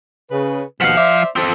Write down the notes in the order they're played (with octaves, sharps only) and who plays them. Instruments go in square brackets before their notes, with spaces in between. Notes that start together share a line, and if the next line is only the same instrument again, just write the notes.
[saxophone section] C#3 B4
[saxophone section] D#2 B2 F#5 [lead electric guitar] F3 F5
[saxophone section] C5 D5 E5
[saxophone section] F3 [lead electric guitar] C4 A4